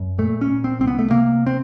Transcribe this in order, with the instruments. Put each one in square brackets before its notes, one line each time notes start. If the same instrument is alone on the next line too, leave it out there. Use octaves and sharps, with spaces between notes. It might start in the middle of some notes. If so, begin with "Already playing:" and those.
Already playing: [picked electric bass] F#2
A#2 A3
C#4
A#2
C4
C2 C4
B3
A3
C3 A#3
C4